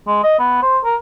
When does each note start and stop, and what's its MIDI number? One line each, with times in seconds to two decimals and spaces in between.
0.07 0.18 56
0.23 0.36 75
0.39 0.61 59
0.62 0.78 72
0.84 0.96 70